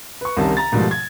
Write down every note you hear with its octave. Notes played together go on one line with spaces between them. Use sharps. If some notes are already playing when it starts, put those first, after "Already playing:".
B4 C#6
C2 C3 D#3 C#4 A5
A#5 A6
G#2 B2 D#3 F3 G3 A3
G#6